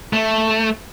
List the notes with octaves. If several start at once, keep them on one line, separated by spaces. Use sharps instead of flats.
A3